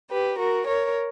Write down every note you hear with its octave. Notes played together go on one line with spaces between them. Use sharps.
G4 B4
F#4 A#4
A#4 C#5